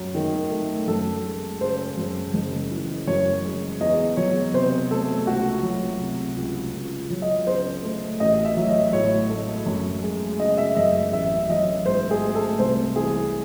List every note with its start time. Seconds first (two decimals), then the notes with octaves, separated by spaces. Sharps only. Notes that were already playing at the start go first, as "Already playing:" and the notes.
Already playing: F#2 F#3
0.15 D#3
0.51 A3
0.87 F#2 A4
1.24 G#3
1.61 C#3 C5
1.97 F#2
2.34 F#1
2.71 E3
3.07 F#2 C#5
3.44 G#3
3.81 E2 D#5
4.17 F#3 C#5
4.54 C3 C5
4.91 A3 A4
5.27 C#2 F#4
5.63 F#3
6.01 C3
6.37 C#2
6.74 C#2
7.10 F#3
7.22 D#5
7.47 C#3 C5
7.83 A3
8.20 A1 D#5
8.45 E5
8.57 F#3
8.69 D#5
8.93 A2 C#5
9.30 A3
9.66 F#2
10.02 G#3
10.40 C#3 D#5
10.58 E5
10.76 F#2 D#5
11.13 A1 E5
11.49 F#3 D#5
11.86 G#2 C5
12.11 G#4
12.23 A3
12.35 A4
12.59 C2 C5
12.96 E3 G#4